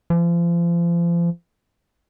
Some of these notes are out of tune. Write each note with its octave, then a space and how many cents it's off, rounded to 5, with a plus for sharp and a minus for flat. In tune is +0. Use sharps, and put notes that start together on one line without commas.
F3 -35